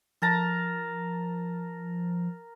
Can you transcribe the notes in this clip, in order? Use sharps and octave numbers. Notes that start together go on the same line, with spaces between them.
F3 A#4 A5 A#5